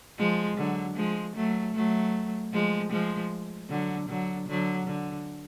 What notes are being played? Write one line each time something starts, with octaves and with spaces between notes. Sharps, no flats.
F3 G#3
D3 F#3
F3 G#3
F#3 A3
F#3 A3
F3 G#3
F3 G#3
D3 F#3
D3 F#3
D3 F#3
D3